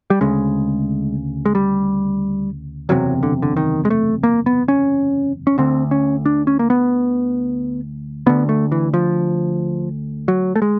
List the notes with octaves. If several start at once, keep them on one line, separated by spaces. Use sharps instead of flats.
G3
D2 C#3 G#3
G#3
G3
F#1 E2 C3 F#3
D3
D3
D#3
G#3
A3
A#3
B3
C#4
C#4
D2 D3 C4
C#4
D4
C#4
A#3
B3
D2 D3 B3
A3
E3
F3
F#3
A3
G#3